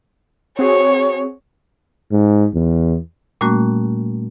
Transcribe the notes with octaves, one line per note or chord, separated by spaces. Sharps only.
C4 F#4 G#4 C#5
G#2
E2
A#2 G3 A3 A#3 C#4 F#4